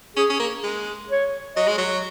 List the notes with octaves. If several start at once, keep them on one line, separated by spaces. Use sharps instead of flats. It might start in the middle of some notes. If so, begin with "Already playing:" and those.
C#4 G#4
C#4
A#3
G#3
C#5
F#3 D#5
G#3
F#3